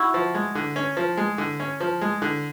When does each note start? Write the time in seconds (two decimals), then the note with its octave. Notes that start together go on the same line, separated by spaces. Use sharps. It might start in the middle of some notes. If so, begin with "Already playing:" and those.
Already playing: E4 F#4
0.14 F3
0.34 G#3
0.55 D3
0.76 C#4
0.97 F3
1.17 G#3
1.38 D3
1.60 C#4
1.80 F3
2.01 G#3
2.22 D3